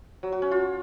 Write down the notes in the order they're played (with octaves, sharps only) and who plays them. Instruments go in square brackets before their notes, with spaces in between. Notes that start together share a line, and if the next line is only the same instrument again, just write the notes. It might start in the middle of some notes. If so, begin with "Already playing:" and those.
[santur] F#3
F#4
C#4
F4